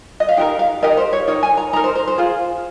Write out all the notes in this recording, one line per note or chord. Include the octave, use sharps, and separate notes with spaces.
D#5
F5
D#4 G4 A#4 G5
F5
D#4 G4 A#4 D#5
C5
C#5
D#4 A#4 C#5
G#5
A#5
D#4 A#4 A#5
C5
C5
C5
F4 G#4